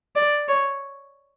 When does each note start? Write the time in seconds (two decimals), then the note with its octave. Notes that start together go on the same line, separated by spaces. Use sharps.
0.15 D5
0.48 C#5